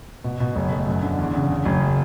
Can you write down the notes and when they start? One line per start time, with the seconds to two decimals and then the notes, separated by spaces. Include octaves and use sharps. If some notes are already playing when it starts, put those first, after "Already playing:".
0.24 B2
0.40 B2
0.56 F#1
0.71 A3
0.87 F#2
1.03 D3
1.19 E2
1.34 C#3
1.50 C#3
1.65 F#1